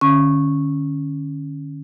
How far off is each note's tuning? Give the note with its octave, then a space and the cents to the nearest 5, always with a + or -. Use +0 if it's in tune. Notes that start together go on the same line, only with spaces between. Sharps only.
D3 +40 C#4 +0 C#6 -10